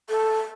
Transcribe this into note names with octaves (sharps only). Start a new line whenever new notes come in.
A4